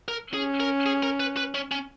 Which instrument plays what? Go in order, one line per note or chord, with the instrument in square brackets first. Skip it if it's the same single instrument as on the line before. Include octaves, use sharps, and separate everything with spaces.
[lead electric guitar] A#4
[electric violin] C#4 [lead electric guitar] G#4
[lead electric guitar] A#4
G#4
A#4
B4
B4
C#4
C#4